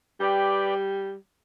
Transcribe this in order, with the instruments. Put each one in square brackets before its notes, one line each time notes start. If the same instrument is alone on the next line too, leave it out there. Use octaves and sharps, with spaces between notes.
[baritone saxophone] G3 [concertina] G4 B4 D5 G5